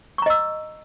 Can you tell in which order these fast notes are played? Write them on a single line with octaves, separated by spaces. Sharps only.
C#6 A#5 D#5 E6